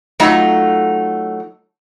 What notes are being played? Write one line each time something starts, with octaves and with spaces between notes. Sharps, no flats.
F#3 A3 D#4 F4 A#5